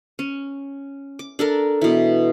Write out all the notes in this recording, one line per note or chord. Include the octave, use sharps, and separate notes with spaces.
C#4
D6
D4 A4 A#4
B2 E3